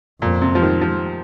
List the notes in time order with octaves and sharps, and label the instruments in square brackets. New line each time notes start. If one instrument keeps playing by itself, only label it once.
[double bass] F2 [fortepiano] A#2
[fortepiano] C3
F3
D#3
F3